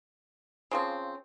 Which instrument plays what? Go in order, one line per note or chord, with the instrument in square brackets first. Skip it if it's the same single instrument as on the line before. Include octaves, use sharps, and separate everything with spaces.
[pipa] C#3 F3 C4